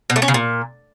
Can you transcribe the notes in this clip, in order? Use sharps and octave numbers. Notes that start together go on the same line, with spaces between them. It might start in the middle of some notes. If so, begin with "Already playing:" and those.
B2
A3
C#4
C#3
A#2